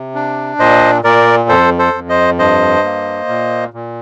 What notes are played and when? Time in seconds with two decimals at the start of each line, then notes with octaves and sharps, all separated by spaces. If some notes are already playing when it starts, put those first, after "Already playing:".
Already playing: C3
0.15 D4
0.59 A#2 C5 D#5
1.04 A#2 A#4 D5
1.49 F2 A4 C5
1.79 A4 C5
1.94 F2
2.09 C5 D#5
2.39 G2 C5 D#5
2.84 A#3
3.29 A#2
3.73 A#2